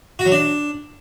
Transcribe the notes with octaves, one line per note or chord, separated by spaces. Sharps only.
F#4
F#3
D4